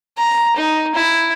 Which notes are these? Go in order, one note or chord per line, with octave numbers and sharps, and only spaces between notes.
A#5
D#4
E4